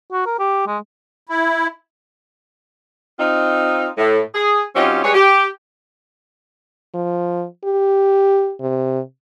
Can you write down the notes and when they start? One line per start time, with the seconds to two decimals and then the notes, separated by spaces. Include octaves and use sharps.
0.12 F#4
0.26 A#4
0.39 G4
0.67 G#3
1.29 E4
3.19 C4 D#4 F4
3.98 A2
4.34 G#4
4.75 F#3 C4 C#4 D#4 F4 G4
5.03 G3 G#3 G#4 B4 C#5
5.15 G4
6.95 F3
7.64 G4
8.61 C3